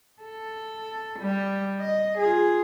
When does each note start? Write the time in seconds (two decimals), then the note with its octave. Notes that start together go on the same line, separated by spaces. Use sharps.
0.22 A4
1.20 G3
1.80 D#5
2.18 F4 G#4